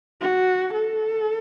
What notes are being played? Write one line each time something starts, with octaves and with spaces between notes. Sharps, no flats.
F#4
A4